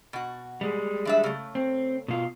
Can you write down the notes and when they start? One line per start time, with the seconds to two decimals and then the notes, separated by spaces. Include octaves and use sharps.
0.13 B2 F#4
0.61 G3 G#3
1.05 E3 D4 E5
1.24 C#3 A3
1.55 C4
2.08 B2 F4